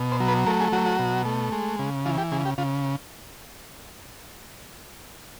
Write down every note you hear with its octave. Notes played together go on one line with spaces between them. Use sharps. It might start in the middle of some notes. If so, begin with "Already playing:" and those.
Already playing: B2
C5
F#3
B4
A3 A#4
G#4
F#3 F#4
F#4
B2
A3
G#3
C#3
E3 F4
G4
C#3 G#4
G4
C#3 F4